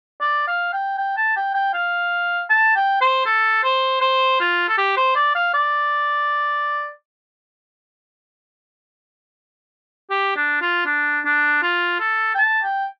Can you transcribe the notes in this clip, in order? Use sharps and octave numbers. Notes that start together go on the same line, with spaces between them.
D5
F5
G5
G5
A5
G5
G5
F5
A5
G5
C5
A4
C5
C5
F4
A4
G4
C5
D5
F5
D5
G4
D4
F4
D4
D4
F4
A4
G5
A5
G5